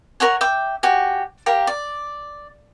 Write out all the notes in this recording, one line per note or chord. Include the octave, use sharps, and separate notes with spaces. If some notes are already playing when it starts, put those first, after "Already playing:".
A#4 C#5 F#5 G#5
E5 G5 D6
F#4 G4 G#5
G4 A#4 F5
D5